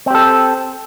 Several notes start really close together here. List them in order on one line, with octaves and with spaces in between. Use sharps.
C4 G4 A4